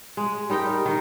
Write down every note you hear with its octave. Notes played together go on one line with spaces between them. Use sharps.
G#3
G3 D#4 A#4 G5
D#3 D#4